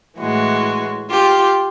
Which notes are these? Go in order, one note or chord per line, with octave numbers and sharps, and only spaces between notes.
A2 E3 G#3 F#4
F4 G4